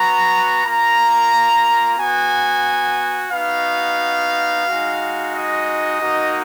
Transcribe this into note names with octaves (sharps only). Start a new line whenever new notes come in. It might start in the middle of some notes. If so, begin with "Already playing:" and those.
Already playing: B3 F#4 A#5
A#3 F4 A#5
B3 F#4 G#5
B3 D#4 F#4 F5
G#3 D#4 F#4
D#5
A#3 D#4 F#4